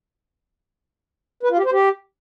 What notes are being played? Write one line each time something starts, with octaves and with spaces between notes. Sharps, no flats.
B4
F4
G4
C5
G4